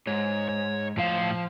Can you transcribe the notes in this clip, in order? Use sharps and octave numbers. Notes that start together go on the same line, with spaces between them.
G#2 C#5
C#5
A2 F3 F5